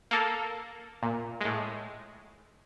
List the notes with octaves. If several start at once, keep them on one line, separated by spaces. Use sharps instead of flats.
A#3 A4
A#2
A2 G#3